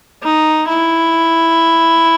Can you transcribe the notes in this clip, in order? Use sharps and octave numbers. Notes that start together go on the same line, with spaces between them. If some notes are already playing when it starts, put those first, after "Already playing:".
D#4
E4